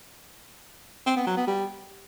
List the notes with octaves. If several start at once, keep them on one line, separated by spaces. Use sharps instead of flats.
C4
B3
F#3
B3
G3